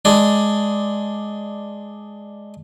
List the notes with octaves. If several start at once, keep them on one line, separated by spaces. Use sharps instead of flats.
G#3 D4